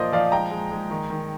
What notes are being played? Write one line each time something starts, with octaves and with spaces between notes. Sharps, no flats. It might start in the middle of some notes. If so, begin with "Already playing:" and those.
Already playing: A#2 F3 A#4 C5 D5 D#5
F3 D5 F5
G#3 G5 A#5
G#3
G#3
D#3
D#3